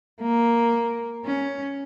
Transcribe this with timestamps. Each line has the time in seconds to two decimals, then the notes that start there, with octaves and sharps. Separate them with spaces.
0.21 A#3
1.25 C#4